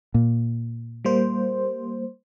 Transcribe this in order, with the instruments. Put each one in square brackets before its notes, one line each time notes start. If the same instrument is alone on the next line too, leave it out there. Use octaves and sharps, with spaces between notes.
[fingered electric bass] A#2
[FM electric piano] G3 A#3 C5